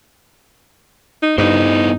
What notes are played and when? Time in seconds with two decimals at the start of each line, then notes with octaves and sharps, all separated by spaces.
1.22 D#4
1.38 G2 B3 D#4 E4 C5